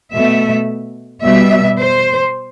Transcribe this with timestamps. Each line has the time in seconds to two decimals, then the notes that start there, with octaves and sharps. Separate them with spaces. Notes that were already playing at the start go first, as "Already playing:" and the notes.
0.12 B2 A3 E5
1.23 B2 G3 E5
1.78 C5